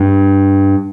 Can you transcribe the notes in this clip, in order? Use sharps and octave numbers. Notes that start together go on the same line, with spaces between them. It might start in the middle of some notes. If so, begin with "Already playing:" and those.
Already playing: G2